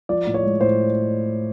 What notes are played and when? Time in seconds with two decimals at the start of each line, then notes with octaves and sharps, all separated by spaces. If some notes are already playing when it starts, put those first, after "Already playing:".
0.09 F3 D5
0.27 A2
0.34 C#5
0.43 G#3
0.61 A2 C5